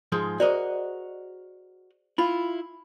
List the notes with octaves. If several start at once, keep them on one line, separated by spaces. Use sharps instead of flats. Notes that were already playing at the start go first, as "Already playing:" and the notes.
G#2 F3 G#3
F#4 G#4 A#4 C5 D5 D#5
E4 F4 B5